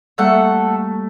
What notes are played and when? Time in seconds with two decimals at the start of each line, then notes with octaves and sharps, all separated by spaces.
0.18 G3 A3 A#3 A4 F#5